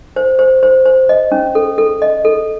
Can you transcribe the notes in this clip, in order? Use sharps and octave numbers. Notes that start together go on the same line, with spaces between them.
C5
C5
C5
C5
D#5
C#4
A4
A4
D#5
A4